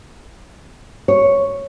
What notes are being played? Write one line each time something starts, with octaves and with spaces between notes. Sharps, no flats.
C#5